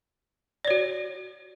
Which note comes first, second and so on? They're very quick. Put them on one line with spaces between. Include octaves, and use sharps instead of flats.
D5 C#5 F#4